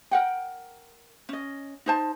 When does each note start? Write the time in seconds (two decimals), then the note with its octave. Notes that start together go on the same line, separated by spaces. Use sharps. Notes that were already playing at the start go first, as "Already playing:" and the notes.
0.11 A#4 F#5 G5
1.29 C#4 D#5
1.86 D#4 C5 A5